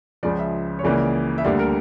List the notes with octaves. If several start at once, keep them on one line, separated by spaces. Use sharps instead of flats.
C#2 C#3 F3 D5
E5
C#5
C#2 C#3 E3 A#3 D5
E5
D2 D3 G3 A#3 D5
A#4